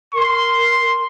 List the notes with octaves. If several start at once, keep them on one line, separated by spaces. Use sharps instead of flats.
A#4 C6